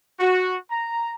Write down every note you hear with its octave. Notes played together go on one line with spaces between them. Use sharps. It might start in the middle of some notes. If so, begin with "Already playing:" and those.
F#4
A#5